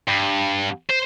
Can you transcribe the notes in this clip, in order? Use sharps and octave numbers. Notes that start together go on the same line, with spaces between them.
G2
C5